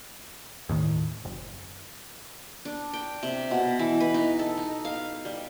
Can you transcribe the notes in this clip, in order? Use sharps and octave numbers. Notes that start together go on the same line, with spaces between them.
D#2 A2 D#3
F#1
D4
G5
C3
B2
E3
B4
D#4
A4
D#4
F5
G3